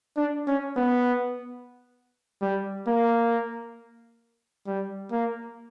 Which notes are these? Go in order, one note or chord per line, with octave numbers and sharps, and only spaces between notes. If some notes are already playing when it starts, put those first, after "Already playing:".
D4
C#4
B3
G3
A#3
G3
A#3